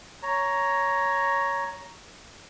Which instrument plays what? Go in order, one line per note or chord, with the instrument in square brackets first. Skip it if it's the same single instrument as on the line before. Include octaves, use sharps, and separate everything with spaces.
[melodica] C#5 A#5